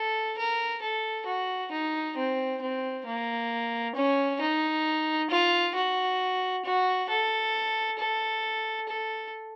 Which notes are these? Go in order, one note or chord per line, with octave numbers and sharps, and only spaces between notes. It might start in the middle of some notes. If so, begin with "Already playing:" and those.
Already playing: A4
A#4
A4
F#4
D#4
C4
C4
A#3
C#4
D#4
F4
F#4
F#4
A4
A4
A4